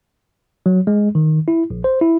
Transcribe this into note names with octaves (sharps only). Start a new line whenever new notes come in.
F#3
G#3
D#3
E4
A#1
C5
E4